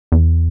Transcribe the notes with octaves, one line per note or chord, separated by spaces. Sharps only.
E2